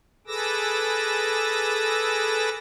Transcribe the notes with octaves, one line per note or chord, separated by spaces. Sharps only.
G#4 A4 B4 D6 E6 A#6